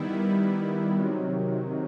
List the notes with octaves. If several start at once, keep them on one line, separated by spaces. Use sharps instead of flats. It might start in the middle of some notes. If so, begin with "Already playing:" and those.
Already playing: D#3 G3 B3 E4
C3 D#3 F#3